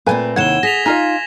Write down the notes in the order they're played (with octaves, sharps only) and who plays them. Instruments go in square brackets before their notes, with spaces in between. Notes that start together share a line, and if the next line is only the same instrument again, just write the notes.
[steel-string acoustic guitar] A#2 A3 C4 [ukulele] B4 G#5
[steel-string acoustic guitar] D#2 C3 E4 [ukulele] F#5 [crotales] G#6 E7 G7
[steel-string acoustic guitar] G#4 [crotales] A#6 B6 F7
[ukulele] D#4 F4 D#5 [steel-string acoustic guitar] G#5